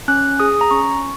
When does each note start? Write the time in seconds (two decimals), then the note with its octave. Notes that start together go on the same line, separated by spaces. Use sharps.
0.08 C#4 F#6
0.40 G#4 D#6
0.61 A#5
0.71 C#4 C#6